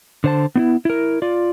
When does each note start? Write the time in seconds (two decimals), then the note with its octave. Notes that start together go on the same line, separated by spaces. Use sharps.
0.24 D3 C5 A5
0.55 B3 D#4 E4
0.85 E4 A#4
1.22 F4 D5